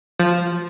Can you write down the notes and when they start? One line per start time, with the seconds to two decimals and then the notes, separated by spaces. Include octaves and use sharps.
0.19 F3